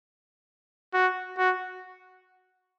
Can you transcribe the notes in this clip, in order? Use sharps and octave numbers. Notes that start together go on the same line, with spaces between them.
F#4
F#4